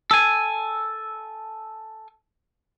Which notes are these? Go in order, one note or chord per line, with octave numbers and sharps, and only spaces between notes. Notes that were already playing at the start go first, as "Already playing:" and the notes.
A4 G#5